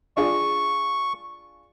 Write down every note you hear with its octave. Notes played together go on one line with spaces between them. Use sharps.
D4 F4 G#4 C#6